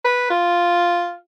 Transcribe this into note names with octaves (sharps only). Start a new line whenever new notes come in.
B4
F4